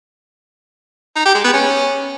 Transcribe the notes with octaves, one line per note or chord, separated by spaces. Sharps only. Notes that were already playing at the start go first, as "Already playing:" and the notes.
D#4
G4
G#3
B3
C#4